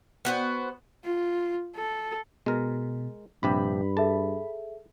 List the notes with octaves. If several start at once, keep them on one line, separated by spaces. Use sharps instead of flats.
B3 F#4 C5
F4
A4
B2 G#3 A#4
A#1 G2 C3 G4 B5
G#4 A4 E5 A5